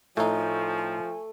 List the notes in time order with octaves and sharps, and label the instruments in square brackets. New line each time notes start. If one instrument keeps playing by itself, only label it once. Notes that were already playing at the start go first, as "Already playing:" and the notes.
[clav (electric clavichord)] A2 D#4 [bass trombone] F3 [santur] A3 [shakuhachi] G#5